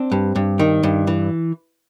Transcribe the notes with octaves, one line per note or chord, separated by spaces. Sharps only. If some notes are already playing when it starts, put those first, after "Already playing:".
Already playing: C4 D4
G2
G2
D#3
G2
E3